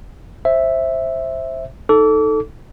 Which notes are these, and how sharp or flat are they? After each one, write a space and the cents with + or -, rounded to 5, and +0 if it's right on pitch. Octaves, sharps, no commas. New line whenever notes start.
C5 +20 E5 +0
D#4 +0 A4 +0 D6 -35